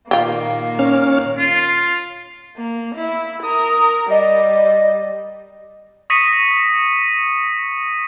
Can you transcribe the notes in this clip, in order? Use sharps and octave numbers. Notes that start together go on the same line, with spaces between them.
A#2 D#3 A#3 F4 G4
C#4 F6
F4
A#3
E4
A#4 D#6
G3 D#5
C#6 D#6 A#6 B6 C#7 D#7